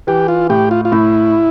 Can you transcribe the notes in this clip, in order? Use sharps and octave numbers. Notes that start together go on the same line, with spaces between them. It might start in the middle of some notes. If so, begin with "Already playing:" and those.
E3 G4
F4
A2 G4
F4
F4
A2 E4